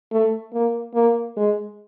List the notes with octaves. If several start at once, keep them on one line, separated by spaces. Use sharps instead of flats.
A3
A#3
A#3
G#3